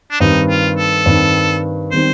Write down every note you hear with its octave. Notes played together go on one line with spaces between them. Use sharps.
D4
G2 D#3 G3 C4 D#4
F4
A4
G2 D#3 G3 C4
D#3 G3 C4 C5